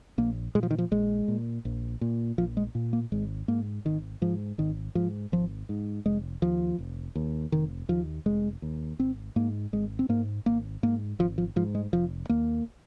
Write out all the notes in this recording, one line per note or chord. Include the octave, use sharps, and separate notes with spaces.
A#1 A#3
A#2 G#3
F3
D#3
F3
A#1 G#3
A#2
A#1
A#2
A#1 F3
G#3
A#2
A#3
G#1 G#3
G#2 A#3
G#1 D#3
G#2 F3
G#1 D#3
G#2 F3
G#1 F3
G#2
F1 G#3
D#2 F3
F1
D#2
F1 D#3
D#2 F3
F1 G#3
D#2
G#1 C4
G#2 A#3
G#1 G#3
C4
G#2 A#3
G#1 A#3
G#2 A#3
G#1 F3
F3
G#2 F3
G#3
F1 F3
D#2 A#3